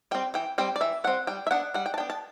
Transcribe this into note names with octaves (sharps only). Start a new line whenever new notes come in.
G3 C4 G5
E3 G5
G3 C4 G5
D5
E3 E5
G3 C4 F#5
G3 G5
E5
B3 D4 F#5
G3 F#5
G5
A5
B3 D4 G5
A5